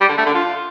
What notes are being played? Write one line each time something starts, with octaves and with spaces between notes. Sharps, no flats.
G3
D3
A3
D3
F4